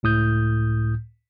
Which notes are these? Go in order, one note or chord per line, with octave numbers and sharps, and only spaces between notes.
C#2 A2 D#6 G6